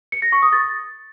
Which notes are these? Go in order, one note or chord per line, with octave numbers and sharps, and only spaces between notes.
C#7
A#6
C#6
D#6
A6